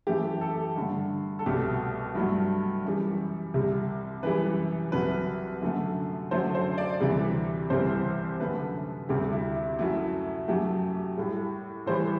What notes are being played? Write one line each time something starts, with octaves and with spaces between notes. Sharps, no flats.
F#2 E3 A3 G4
A4
G2 D3 A3
A4
C2 B2 A3 G4
G2 F#3 A3
F#2 E3 G3
C2 C3 G3
F#2 E3 G3 B4
C2 C3 F#3 B4
F#2 D3 F#3 A3
F#2 D3 F#3 A3 C5
C5
D5
D2 C3 E3 G3
C2 C3 E3 G3 C5
F#2 D3 A3 B4
D2 C3 G3 G4
E4
E4
F#2 F#3 A3 E4
F#2 F#3 A3 G4
A2 G3
A2 E3 G3 C5